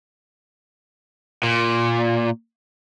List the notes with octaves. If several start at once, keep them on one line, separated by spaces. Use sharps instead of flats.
A#2